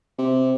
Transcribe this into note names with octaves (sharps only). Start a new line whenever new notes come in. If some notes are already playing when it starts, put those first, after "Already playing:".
C3